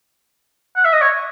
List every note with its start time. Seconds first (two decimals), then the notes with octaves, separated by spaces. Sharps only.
0.76 F#5
0.85 E5
0.93 D#5
1.01 C#5